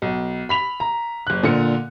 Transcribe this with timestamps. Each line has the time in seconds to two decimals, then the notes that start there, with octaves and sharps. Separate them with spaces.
0.02 B1
0.49 B5 B6 F7
0.80 A#5
1.27 F#1 F#6
1.43 A#2 D3 C#7